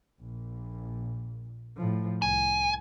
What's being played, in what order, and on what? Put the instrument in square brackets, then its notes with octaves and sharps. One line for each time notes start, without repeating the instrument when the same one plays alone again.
[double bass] A#1 A#2
A2 F3
[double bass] C2 [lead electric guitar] G#5